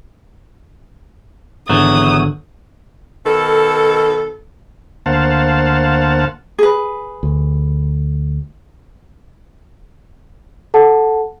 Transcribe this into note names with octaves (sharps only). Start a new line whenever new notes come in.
G#1 E2 D3 F#3 D#6
B2 D#3 A4
D2 A#3 C5 F5 F#5 A5
G#4 B4
D2
A4 F#5 A5